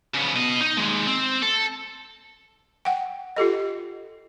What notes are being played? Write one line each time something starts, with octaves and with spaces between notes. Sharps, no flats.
C#3 B3
B2 D#5
D#4
D#2 G#3
C4
A4
F#5 G5
F4 G4 A4 D#5